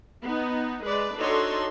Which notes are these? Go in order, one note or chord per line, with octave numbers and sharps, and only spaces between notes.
B3 D#4
G#3 B4 D5
D4 D#4 F#4 A4 C#5 C6